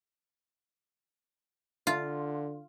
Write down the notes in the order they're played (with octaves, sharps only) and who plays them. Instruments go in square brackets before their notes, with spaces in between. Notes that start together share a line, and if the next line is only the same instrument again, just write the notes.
[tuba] D3 [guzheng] F4